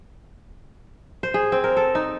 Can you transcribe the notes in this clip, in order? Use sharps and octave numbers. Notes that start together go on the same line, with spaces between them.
C5
G#4
C4
A#4
A4
D#4